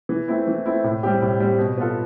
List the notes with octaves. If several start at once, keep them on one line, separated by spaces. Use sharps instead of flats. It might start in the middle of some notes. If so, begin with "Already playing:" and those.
E3
A3 C4 E4
E3
A3 C4 E4
A2
G3 C4 G4
A2
G3 C4 G4
B2
B3 F4 A4